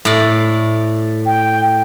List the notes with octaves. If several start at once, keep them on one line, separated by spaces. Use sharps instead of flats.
A2 D5
G5